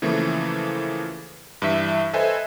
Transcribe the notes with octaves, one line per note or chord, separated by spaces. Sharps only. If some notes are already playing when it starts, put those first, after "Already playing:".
C#3 E3 F3 A3 A#3
G2 E3 E5 B6
A4 B4 C5 D#5 E5 G#5